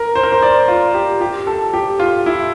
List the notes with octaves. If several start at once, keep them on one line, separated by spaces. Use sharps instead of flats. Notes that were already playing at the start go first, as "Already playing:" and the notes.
Already playing: A#4
C5
A#4
C5
D5
F4
G4
G4
A4
G4
F4
E4